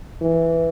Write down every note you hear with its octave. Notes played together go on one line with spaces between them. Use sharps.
E3